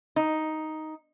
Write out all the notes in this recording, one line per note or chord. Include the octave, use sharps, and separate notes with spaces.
D#4